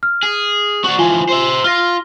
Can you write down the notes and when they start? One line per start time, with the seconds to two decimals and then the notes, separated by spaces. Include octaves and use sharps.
0.03 F6
0.23 G#4
0.84 F#4 D5 C#6
0.99 E3 F3 F4 G#5
1.29 C5 E5
1.64 F4 F6 A#6